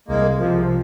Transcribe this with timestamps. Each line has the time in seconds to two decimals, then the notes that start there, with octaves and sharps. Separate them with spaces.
0.08 C2 G#3 A#3
0.39 C3 F3